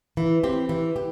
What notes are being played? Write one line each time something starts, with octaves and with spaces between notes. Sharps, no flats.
E3
C4 G4
E3
G4